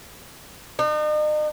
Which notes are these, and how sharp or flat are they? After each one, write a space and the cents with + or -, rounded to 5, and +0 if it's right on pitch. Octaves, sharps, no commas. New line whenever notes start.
D#4 -40